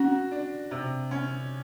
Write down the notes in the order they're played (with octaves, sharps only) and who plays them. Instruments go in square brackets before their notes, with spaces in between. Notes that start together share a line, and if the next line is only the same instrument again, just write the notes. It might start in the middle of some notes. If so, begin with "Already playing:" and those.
Already playing: [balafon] C#4 [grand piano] F#4
[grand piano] D4
C3
C#4